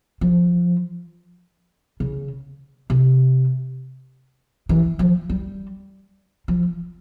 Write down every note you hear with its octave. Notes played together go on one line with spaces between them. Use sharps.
F3
C#3
C3
E3
F3
G3
F3